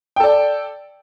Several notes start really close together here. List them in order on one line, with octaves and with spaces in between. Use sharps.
G5 A4 D5